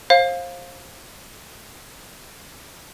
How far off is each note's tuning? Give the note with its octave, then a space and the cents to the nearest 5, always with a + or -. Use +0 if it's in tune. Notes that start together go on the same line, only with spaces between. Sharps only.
C5 +30 F5 +10